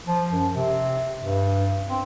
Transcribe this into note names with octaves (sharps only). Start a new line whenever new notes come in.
F3
F#2
C3
G2
C4